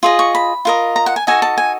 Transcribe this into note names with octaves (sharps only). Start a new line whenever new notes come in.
F4 G#4 D#5
C#6
B5
F4 A#4 D#5
A#5
F#5
G#5
D#4 F#4 A4 G#5
A5
G#5